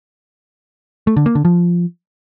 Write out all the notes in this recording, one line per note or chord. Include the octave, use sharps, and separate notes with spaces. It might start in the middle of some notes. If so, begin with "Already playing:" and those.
A3
D3
A#3
D3
F3